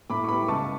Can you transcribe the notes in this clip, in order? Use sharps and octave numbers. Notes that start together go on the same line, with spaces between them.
A2 B5 D6
C#6
G3 B3 B5 D6
C#2 A5 C#6